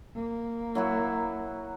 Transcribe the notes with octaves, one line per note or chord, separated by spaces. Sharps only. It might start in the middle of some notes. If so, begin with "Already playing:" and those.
A#3
F#3 E4 F#4